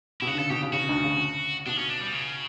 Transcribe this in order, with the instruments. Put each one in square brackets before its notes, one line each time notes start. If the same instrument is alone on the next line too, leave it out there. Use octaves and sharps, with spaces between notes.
[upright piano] B2 [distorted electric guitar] E4
[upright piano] C#3 [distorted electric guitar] F#4
[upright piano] D3
[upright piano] C#3 [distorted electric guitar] A4
[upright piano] B2 [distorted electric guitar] G4
[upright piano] C#3
[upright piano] C#3 [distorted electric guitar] F#4
[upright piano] D2 D3
C#3
[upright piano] B2 [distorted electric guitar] D4
[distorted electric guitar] C#4
D4
G3
C#3